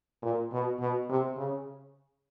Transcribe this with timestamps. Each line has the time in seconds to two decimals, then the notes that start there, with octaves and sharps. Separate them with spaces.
0.22 A#2
0.52 B2
0.79 B2
1.09 C3
1.37 C#3